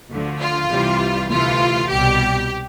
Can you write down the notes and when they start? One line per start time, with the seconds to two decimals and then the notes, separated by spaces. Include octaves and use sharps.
0.10 D2 D3 F3 A3
0.40 F4
0.70 C2 C3 E3 G3
1.29 D2 C3 E3 A3 F4
1.89 C2 B2 G3 G4